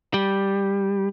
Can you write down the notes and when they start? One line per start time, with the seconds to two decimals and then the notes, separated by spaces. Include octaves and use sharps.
0.14 G3